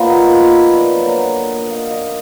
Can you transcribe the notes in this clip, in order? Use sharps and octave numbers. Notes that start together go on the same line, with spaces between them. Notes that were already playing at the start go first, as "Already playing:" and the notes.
Already playing: A#2 F3 B3 D#4 F5
F4
B4
B4
D5
D3 F#3 A#3
D#5
F5
D#5